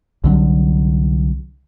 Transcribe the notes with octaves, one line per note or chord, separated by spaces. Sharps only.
C2 D3 F#3